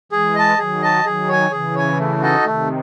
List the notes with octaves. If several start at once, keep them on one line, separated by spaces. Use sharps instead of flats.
E3 G#3 G#4
D#5 A5
D#3 F#3 G#4
D#5 A5
D#3 F#3 G#4
C#5 G#5
C#3 E3 G#4
C#5 G#5
A3
D#4 F#4 A4 D#5
C3 D#3 A3